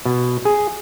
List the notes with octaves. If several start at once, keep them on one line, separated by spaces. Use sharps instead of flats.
B2
G#4